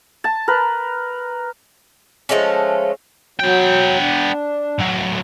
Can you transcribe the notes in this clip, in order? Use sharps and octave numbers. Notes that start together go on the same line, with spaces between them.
A5
A#4 B4
F3 G#3 A3 C#4
F#3 B3 G5
D4
A2 F#3